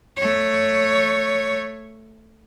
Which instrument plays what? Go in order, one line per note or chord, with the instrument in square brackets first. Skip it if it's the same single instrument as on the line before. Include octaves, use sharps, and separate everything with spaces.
[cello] A3 C#5